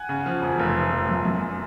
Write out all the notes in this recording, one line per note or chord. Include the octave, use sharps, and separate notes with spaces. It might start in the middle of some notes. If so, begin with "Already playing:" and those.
Already playing: F#5 G#5
C#3
F3
E1
F1
F3
F3
F#2
F#2